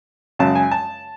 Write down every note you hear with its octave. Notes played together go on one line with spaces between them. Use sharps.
F#2 C#3 G#3 A5
G#5
A5